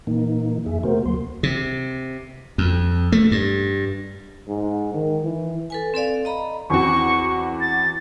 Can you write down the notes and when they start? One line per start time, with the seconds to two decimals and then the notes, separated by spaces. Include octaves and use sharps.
0.07 A#2 E3 A#3 D#4
0.66 F2 G#4 E5
0.83 C3 A3 B3 F#4 A#4 C5
1.06 D2 F#3 A#3 C6
1.43 C3
2.58 F2
3.12 A3
3.32 G2
4.48 G#2
4.94 D#3
5.24 E3
5.70 A4 B4 G#5
5.94 C4 A4 D5 F5
6.25 D#5 A#5 B5
6.70 E2 C4 F#4 C#6
7.61 A6